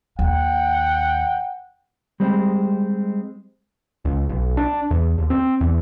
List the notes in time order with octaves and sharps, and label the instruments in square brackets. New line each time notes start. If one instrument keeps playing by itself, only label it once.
[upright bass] D#2 [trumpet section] F#5 G5
[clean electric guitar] G3 G#3 C4
[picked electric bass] C#2
B1
D4
E2
D#2
C4
E2